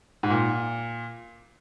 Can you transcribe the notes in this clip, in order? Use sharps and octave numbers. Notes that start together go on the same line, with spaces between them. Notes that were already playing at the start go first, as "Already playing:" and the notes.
G#2
A#2